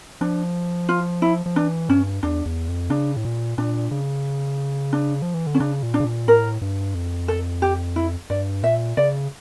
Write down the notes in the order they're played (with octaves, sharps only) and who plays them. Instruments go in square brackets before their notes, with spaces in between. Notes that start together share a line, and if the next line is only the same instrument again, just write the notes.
[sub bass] F3 [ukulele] D4
[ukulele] F4
E4
[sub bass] F3
[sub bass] E3 [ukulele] D4
[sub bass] G2 [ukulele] C#4
[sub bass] E2 [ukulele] D4
[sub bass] E2
F2
[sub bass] C#3 [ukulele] D4
[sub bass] A2
A#2
[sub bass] A#2 [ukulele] D4
[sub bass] C#3
[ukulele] D4
[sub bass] F3
E3
D3
[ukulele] C#4
[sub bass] C#3 [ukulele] D4
[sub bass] A#2
[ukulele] D4
[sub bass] C#3
A#2
[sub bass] A2 [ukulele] A#4
[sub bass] G2
F2
[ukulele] A4
G4
E4
[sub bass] G2 [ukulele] D5
[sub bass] A#2 [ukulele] E5
[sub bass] C#3 [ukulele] D5